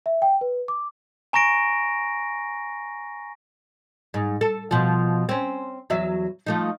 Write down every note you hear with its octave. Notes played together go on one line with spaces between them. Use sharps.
E5
G5
B4
D6
G#5 A#5 C#6 A#6 D7
G#2
A4
B2 F3
C4 C#4
E2 F#3 E5
F3 A3 D#4